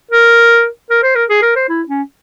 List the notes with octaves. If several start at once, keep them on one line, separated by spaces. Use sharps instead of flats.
A#4
A#4
C5
A#4
G#4
A#4
C5
E4
C#4